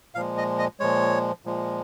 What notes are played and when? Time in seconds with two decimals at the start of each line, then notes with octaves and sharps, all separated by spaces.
0.15 A#2 F3 G#3 F5
0.37 D#5
0.59 D#5
0.80 A#2 F3 G#3 C#5
1.45 A#2 F3 G#3